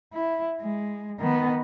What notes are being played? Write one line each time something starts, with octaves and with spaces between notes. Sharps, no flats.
E4
G#3
D#3 B3